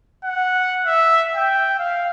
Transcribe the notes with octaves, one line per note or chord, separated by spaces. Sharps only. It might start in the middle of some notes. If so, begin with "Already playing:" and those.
F#5
E5
G5
F5